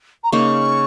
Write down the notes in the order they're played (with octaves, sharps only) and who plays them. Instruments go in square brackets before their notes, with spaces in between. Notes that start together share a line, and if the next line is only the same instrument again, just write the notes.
[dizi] A#5
[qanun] C#3 A#3 D#4 [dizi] C#6